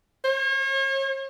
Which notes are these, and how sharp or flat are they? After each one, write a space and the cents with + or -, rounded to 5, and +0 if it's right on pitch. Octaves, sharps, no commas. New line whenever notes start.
C#5 -40